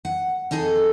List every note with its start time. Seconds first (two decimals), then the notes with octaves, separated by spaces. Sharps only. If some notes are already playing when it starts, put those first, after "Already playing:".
0.05 F#5
0.51 F2 D#4 G#4 A4